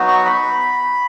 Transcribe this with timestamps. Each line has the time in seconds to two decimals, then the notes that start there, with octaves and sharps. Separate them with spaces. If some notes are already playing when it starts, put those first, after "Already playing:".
Already playing: F#3 B3 D#4 F#4
0.08 C#6
0.25 B5